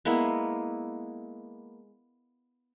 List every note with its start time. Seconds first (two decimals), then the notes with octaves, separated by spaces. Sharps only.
0.05 G#3 A#3 B3 E4